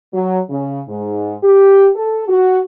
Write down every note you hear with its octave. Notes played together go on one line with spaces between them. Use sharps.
F#3
C#3
G#2
G4
A4
F#4